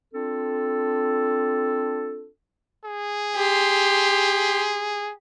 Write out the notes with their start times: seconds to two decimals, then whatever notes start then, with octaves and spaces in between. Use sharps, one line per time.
0.14 C4 D4 F4 A4
2.85 G#4
3.36 G4 C6